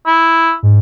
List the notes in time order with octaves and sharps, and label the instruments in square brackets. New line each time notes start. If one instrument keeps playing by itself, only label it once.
[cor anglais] E4
[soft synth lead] G#2